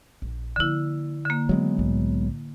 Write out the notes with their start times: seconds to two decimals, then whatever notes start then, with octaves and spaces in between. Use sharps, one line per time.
0.22 A#1
0.56 D3 F3 A#3 E4
1.26 D3 A#3
1.49 D#3 F#3 G#3 B3 C4
1.77 C2 A2